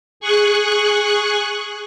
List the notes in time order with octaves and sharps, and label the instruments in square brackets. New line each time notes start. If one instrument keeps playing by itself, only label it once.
[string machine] G#4 C#6 F#6